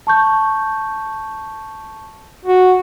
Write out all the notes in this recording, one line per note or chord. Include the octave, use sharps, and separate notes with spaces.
A5 C#6 G6
F#4